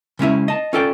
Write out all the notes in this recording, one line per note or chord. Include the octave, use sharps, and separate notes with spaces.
C#3 G#3 C#4 E4
D#5 A5
C#4 F4 A4 D5 G5